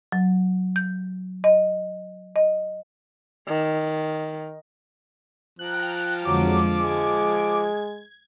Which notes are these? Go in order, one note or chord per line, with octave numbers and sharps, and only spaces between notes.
F#3
G6
D#5
D#5
D#3
F3 G5 A#5 F6 F#6
F2 D3 F#3 G#3 D6
G#3 G#6